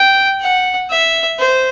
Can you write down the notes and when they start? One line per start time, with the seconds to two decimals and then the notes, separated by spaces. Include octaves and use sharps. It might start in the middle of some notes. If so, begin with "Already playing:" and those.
Already playing: G5
0.41 F#5
0.90 E5
1.39 C5